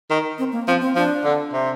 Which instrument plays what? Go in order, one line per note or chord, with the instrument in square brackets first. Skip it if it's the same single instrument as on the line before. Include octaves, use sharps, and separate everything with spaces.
[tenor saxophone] D#3
[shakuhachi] C4
A#3
[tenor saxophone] F3 [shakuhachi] C4
[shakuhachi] C4
[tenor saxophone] F3 [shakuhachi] D4
[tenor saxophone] D3
C3